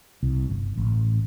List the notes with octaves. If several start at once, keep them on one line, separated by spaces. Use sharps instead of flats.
C2
G1
A1